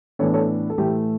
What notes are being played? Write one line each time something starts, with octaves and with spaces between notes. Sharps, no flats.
A2 E3 B3 D4 A4 C#5
A4 C#5
A4
A2 E3 A3 G4